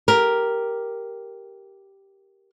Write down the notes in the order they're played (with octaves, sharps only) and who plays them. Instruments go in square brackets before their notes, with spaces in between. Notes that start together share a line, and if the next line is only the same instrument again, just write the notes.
[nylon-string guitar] G4 A#4